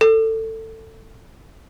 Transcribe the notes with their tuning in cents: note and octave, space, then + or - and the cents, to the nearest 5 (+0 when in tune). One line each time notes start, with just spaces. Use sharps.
A4 +20